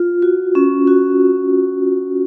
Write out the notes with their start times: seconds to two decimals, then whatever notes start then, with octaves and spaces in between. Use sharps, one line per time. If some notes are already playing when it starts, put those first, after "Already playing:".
Already playing: F4
0.22 F#4
0.55 C#4
0.87 F#4